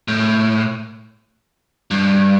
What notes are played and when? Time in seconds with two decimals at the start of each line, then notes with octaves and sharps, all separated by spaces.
0.08 A2
1.91 G2